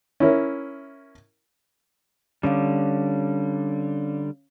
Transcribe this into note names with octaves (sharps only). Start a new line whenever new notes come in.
C#4 E4 A#4
D3 G3 C#4 C#5 F5